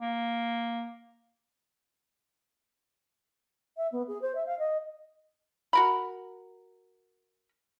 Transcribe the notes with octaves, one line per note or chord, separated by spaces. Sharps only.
A#3
E5
B3
G#4
C5
E5
F5
D#5
F#4 A#4 B5